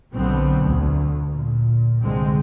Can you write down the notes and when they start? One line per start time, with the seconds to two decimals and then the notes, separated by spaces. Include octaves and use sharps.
0.12 B1 B2 D3 B3 C4
0.61 D2
1.32 A#2
2.00 C2 G2 D3 G#3 C4